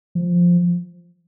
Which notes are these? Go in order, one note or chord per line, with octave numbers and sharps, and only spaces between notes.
F3